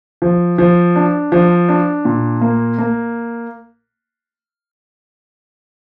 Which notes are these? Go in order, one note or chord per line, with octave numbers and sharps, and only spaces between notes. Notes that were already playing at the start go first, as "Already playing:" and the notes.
F3
F3
D4
F3
D4
A#2
A#3
A#3